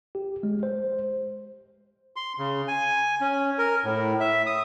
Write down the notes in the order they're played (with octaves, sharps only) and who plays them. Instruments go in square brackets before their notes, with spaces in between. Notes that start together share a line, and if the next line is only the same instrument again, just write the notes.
[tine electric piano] G4
G#3
C5
[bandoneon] C6
C#3
G#5
C#4
A#4
A2
E5
D#6